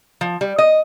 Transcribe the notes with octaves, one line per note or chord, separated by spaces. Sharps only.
F3
G3
D#5